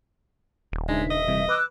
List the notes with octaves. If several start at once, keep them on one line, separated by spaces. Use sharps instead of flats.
D#1
C#3 G#3 D4 D#4 E5
D#5
C3 E3 G3
B4 D6 E6 F#6